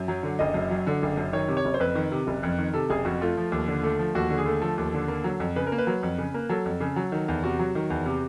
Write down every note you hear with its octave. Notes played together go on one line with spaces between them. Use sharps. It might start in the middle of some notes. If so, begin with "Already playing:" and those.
Already playing: F#2
F#3
D3
F#1 D#5
F#2
F#3
D3
F#1
F#2
D#3 C#5
C3
C#5
F#1
C5
F2 B4
D#3
C3
F#1
F2
D#3
C3 A4
F#1 G#4
F2 F#4
A3 F4
F3
D#2
D3
A3
F3
D#2 F#4
D3
G#4
A3
F3 A4
D#2
D3
A#3
F#3
F2
C#3 B4
A#4
A#3
B4
F#3
F2
C#3
A#3
F#3 A4
F2
C#3
F#3
D#3
E2
C3 F#4
F#3
D#3
E2
C3